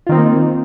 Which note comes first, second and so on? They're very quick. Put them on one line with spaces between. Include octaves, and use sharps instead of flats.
F4 D#3 C4 D#4 A#3